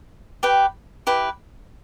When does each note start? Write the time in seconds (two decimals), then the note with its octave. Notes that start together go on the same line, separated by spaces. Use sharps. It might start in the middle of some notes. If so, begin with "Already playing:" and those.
0.43 G4 B4 G5
1.07 E4 G4 B4